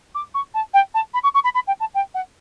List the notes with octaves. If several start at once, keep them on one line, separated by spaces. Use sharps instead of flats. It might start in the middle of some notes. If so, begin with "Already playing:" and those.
D6
C#6
A5
G5
A5
B5
C#6
C#6
B5
B5
G5
A5
G5
F#5